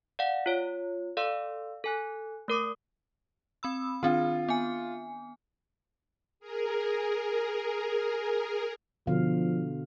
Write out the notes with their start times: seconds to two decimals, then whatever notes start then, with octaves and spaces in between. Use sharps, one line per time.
0.19 D5 F5 F#5
0.46 F4 C#5
1.17 A4 D5 F5 C6 E6
1.84 A4 G#5 F#6
2.48 A3 A#4 D6 D#6
3.63 C4 B5 E6
4.03 D#3 C4 D4 F4
4.49 B3 G#5
6.40 G#4 A#4
9.07 B2 D3 F3 F5